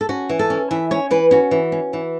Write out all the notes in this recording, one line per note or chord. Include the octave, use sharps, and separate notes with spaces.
A4
C#4 F#4
E3
A4
C#4
E3 E5
C#4 C#5
E3 B4
C#4 F#4
E3
C#4
E3